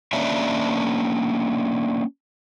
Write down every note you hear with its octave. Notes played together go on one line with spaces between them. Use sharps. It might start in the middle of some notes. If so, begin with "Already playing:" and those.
A#3 C#4 D4 C#5 D5 E5